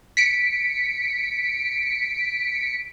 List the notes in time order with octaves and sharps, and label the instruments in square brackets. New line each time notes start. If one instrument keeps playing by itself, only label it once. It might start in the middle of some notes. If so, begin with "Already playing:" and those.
[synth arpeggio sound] B6 C#7 D7